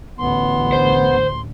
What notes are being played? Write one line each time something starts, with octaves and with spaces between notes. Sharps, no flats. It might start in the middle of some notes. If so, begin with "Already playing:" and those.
A1 D2 B3 C6
C5